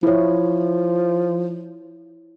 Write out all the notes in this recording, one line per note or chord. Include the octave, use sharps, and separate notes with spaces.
F3 E4 C#5